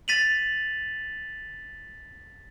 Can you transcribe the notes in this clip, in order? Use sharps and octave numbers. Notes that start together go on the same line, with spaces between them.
A6 B6 D#7 F7 F#7